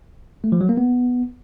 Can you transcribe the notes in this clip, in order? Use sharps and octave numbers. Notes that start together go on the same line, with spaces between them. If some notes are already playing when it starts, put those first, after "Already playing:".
A3
F3
F#3
A#3
B3